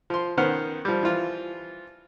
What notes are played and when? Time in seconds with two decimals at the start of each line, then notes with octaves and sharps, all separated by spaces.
0.10 F3 C6
0.37 D#3 B3 C#4 C5 F#5 F6
0.85 F3 G3
1.03 E3 F3 F4